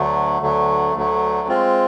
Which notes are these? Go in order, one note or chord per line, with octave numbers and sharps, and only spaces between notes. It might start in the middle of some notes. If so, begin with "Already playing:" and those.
Already playing: D2 D3 F#3 A3
D2 D3 F#3 A3
D2 D3 F#3 A3
G#3 C4 F4